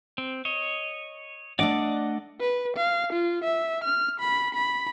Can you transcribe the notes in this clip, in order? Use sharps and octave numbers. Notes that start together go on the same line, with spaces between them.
C4
C#5 D#5
A3 D4 D5 D#5 F#5 D6
B4
F5
F4
E5
F6
B5
B5